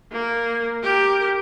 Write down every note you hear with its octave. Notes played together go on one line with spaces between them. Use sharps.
A#3
G4 A#4